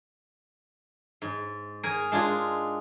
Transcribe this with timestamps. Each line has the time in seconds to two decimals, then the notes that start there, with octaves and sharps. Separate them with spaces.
1.22 G#2
1.83 G#4 A#4 G#5
2.12 G#3 D4 F4 G#4